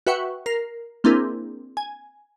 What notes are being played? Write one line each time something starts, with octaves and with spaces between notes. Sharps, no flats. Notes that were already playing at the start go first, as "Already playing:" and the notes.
F#4 B4 E5 F#5 G5 C#6
A#4 C7
A#3 C4 D4 E4 G#4 A#4
G#5